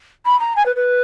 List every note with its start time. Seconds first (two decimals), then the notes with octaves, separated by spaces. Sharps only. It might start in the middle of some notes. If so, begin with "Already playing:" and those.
0.26 B5
0.40 A#5
0.56 G#5
0.66 B4
0.76 B4